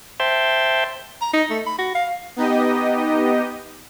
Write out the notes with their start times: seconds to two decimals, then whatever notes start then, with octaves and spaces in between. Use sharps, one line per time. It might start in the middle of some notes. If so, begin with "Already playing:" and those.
0.20 C5 E5 G5 A5 C6
1.22 A#5
1.33 D#4
1.50 A3
1.66 B5
1.79 F#4
1.95 F5
2.36 B3 D#4 G4 D#5